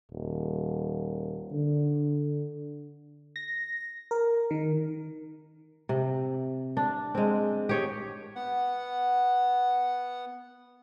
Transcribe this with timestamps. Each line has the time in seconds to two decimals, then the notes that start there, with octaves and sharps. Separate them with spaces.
0.12 D#1
1.52 D3
3.36 A#6
4.11 A#4
4.51 D#3
5.89 C3
6.77 D4
7.15 G#3 C4
7.69 G4 C#5 D#5
8.36 B3 F#5